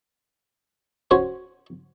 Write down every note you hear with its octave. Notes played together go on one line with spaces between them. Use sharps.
C#4 F#4 C5 C#5